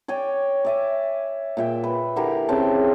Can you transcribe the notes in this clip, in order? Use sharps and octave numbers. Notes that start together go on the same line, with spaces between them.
C#5 D5 G5 G#5
D5 E5 G#5
A#2 E5 G5
B4
D3 E3 G4 A#4
C#3 C4 G5 A5